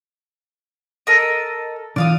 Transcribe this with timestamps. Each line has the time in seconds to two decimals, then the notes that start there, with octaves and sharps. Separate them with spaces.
1.07 A4 A#4 D#5
1.96 D3 E3 F4 D5 F5 D#6